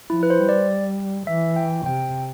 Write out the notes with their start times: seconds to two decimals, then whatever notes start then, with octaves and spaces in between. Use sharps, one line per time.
0.10 F3 E4
0.23 B4
0.30 C5
0.39 G3
0.49 D5
1.27 E3 E5
1.56 G5
1.86 C3 G5